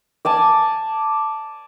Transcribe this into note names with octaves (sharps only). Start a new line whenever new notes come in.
D5 G#5 A5